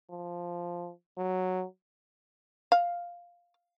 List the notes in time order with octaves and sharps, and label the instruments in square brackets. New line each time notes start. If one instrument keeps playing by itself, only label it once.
[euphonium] F3
F#3
[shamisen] F5